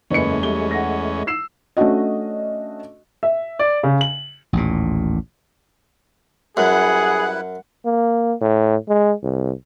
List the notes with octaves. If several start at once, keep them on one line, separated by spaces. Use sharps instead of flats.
F#1 E2 G#3 A3 C#4 B4 C#7
G3 G7
F#5 A#6
E6 C7 E7
A3 C#4 D4 F#4 D#5
E5
D5
C#3
F#7
A1 D#2 A#2
F#2 G3 E4 G#4 B4 F#5
A#3
A2
G#3
C2